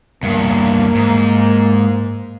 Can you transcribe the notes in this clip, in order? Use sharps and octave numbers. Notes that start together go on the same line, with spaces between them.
E2 G2 A#3
G#2